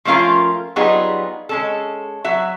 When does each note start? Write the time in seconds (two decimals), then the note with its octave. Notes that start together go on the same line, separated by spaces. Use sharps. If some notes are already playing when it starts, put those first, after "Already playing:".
0.05 F3 A3 C#4 F4 A#4
0.76 F#3 G3 B3 D#4 F4 G#4
1.49 G#3 C#4 A4
2.24 F#3 F#4 E5